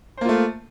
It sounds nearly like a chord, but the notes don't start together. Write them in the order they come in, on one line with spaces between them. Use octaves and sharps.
C5 A#3 F4 A3